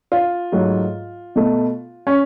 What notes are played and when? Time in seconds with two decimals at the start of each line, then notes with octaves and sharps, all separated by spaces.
0.12 F4
0.52 G#2 F#3 A3
1.36 B2 A3
2.07 C#4